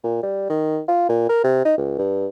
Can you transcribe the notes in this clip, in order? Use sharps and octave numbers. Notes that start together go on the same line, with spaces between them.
A#2
G3
D#3
F4
A#2
A#4
C3
D#4
C#2
G2